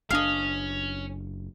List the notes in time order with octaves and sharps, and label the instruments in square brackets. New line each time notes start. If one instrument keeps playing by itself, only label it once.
[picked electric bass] F#1 D4 [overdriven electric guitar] C#4 [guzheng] D#5 F5